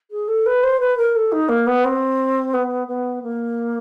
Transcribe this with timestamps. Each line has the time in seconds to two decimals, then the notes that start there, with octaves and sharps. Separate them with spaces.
0.10 G#4
0.27 A4
0.45 B4
0.63 C5
0.79 B4
0.97 A#4
1.15 A4
1.31 D#4
1.48 A#3
1.66 B3
1.84 C4
2.53 B3
2.87 B3
3.22 A#3